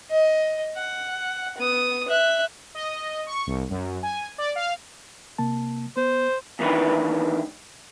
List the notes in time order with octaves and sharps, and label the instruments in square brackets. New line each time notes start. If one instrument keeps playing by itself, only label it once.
[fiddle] D#5
F#5
B3 D#6
E5 F#6
[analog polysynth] D#5
C#6
C2
F#2
G#5
D5
F5
[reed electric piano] C3 A#3 A5
[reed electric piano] B3 [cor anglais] C5
[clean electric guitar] E2 A2 D#3 E3 D4 B4